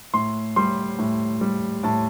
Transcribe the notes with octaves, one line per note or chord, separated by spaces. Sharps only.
A2 C6
G3 C6
A2
G3
A2 A5